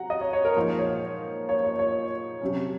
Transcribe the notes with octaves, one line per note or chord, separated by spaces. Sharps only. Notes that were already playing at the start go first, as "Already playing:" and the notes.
Already playing: C3 F#3 F#5 A#5
D#5
C#5
C#5
A#4
A#2 F3 G#3 D#4 C5
C#5
C#5
C#5
C#5
C3 F#3 C#4